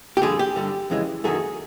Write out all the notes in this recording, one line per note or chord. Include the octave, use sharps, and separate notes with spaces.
G4
F2 D3 G3 G#4
G4
G2 D3 G3
F2 C#3 E3 G#3
F#2 D#3 F#3 A3 G#4